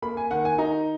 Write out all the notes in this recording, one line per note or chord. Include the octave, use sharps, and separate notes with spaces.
A#3 B5
G#5
D#3 F#5
G#5
D#4 A#5